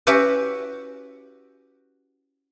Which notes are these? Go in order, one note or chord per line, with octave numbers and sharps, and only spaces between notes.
C#4 E4 F#4 G4 B4